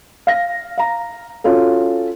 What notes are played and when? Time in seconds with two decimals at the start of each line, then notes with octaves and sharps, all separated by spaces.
0.27 F5 A#6
0.78 F5 A#5
1.44 C#4 F4 F#4 A4